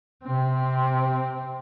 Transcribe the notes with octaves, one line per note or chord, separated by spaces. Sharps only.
C3 C4